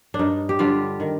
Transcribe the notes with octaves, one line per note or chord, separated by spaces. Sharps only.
D4
G2 D#4
G4
D3 G3 F4
D#3